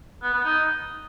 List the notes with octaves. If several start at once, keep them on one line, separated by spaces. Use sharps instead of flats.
B3
B3
D#4